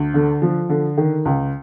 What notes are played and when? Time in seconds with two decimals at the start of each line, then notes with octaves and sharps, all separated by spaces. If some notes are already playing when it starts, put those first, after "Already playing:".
Already playing: D2
0.14 D3
0.42 F3
0.69 D3
0.97 D#3
1.25 C#2